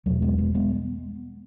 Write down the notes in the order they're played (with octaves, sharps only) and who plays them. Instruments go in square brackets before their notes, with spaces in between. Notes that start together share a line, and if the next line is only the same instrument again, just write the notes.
[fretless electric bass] E2 B2 F#3 A3
G#3 B3
G#3 B3
G#3 B3